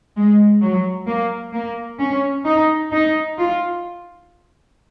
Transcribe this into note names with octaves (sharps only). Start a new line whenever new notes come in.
G#3
F#3
A#3
A#3
C#4
D#4
D#4
F4